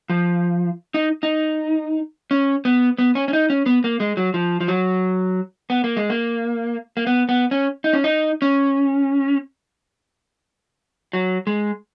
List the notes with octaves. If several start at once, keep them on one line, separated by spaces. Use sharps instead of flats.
F3
D#4
D#4
C#4
B3
B3
C#4
C#4
D#4
C#4
B3
A#3
G#3
F#3
F3
F3
F#3
B3
A#3
G#3
A#3
A#3
B3
B3
C#4
D#4
C#4
D#4
C#4
F#3
G#3